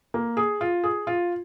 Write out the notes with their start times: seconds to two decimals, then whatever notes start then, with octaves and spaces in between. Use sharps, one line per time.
0.14 A#3
0.37 G#4
0.61 F4
0.84 G#4
1.07 F4